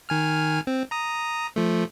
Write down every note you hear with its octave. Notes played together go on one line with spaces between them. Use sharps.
D#3 G#5 F6
C4
A#5 D#6
F3 A3